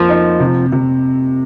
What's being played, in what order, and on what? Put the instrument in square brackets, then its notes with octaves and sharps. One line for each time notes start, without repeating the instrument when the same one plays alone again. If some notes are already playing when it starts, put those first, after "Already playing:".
Already playing: [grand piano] F2 A#3 [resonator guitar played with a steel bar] F3
[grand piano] D#4
C3
C3